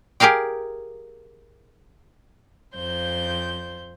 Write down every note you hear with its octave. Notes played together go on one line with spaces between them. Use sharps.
G4 G#4 A#4 F5 G5
F2 C5 G6